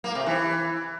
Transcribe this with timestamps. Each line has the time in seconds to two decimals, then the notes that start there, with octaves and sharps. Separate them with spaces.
0.04 A#3
0.15 C3
0.26 E3